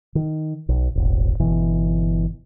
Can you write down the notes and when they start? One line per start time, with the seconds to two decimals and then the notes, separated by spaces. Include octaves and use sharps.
0.15 D#3
0.69 B1
0.95 D#1 G#1
1.40 G1 B2 E3